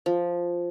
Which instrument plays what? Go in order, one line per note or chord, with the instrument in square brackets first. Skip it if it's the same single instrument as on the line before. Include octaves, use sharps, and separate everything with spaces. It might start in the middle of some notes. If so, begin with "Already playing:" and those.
[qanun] F3